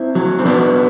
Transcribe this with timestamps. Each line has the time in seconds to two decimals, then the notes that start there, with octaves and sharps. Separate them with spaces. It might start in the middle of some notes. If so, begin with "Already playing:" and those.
Already playing: C4 E4
0.15 F#3
0.39 C4
0.45 F#3 B3 D4